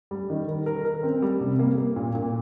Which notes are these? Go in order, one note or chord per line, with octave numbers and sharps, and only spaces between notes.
G3
D#3
A#4
A#4
A#4
C4
G3
C3
A#3
A#3
A#2
A#2